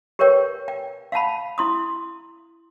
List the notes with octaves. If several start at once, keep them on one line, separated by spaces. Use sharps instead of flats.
G4 A#4 B4 C#5 G5
G5
F5 F#5 A5 B5
E4 C6 D#6